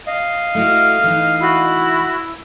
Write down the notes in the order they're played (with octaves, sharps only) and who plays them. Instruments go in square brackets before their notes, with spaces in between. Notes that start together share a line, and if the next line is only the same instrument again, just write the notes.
[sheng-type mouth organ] D#5 F5
[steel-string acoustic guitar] A3 E4 F#4 [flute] F6
[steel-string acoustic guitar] E3 D#4
[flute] E4 [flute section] F#4 B5